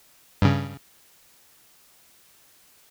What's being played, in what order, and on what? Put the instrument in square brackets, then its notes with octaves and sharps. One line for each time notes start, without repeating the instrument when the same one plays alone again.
[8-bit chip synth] G2 C#3